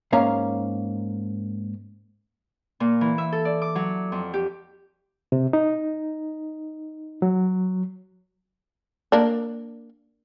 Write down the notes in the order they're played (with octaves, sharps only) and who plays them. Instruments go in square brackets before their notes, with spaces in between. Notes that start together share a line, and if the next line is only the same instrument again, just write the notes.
[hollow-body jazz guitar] G#2 A#3 C#4 F5 A#5
[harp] A#2
E3
E5
A4
D5
D6
F#3
F2
G4
[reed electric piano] C3
D#4
F#3
[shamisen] A#3 D4